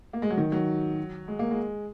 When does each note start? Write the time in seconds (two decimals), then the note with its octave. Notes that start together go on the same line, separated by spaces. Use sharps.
0.13 A#3
0.22 G#3
0.30 F#3
0.37 D#3
0.52 F#3
1.28 G#3
1.39 A#3
1.51 G#3